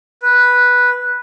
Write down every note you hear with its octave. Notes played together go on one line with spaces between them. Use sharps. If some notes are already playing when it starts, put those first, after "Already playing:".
B4